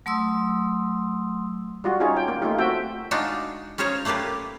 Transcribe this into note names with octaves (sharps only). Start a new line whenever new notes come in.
F#3 A3 C6 D#6 E6
G3 F4 F#4
C#4 D#4 F4 G4 G#4 C#5
G5
A#3
A3 A#3 D#4 F4 G4
A3 C4 F#4 E5 G5
G#3 D4 D#4 F4 F#4
C#4 F4 G#4 C5 C#5 A#5
A3 A#3 F4 G4 B4